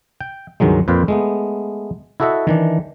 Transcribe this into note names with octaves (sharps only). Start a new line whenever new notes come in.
G5
C#2 G2 D#3 F#3 G#3
F2 A#2 B4 C5 F5 G5
G#3 A3 B3
E4 F#4 A4 D#5 E5 F#5
D#3 E3 D4